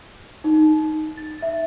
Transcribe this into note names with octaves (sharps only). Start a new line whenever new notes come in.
D#4
A6
E5